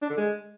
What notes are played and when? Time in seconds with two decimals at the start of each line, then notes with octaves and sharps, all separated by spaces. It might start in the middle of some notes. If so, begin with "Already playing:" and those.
0.02 D4
0.10 D3
0.18 G#3